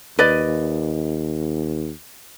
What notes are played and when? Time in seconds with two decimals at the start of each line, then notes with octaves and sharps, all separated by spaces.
0.19 D#2 B4 D5 D#5